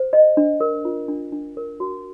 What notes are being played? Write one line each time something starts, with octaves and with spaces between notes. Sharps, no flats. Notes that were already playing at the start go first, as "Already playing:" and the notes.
Already playing: C5
D#5
D4
A#4
F4
D4
D4
A#4
F#4